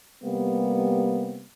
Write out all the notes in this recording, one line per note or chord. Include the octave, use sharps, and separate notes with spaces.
C3 G3 A#3 B3